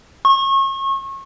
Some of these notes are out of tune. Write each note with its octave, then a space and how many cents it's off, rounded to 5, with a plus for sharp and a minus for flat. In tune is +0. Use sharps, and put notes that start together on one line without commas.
C#6 -35